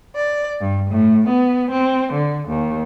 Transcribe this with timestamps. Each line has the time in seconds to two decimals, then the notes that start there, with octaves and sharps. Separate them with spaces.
0.15 D5
0.60 G2
0.90 A2
1.28 B3
1.71 C4
2.13 D3
2.48 D#2